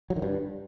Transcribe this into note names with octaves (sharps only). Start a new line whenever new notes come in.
F#3
D#3
G2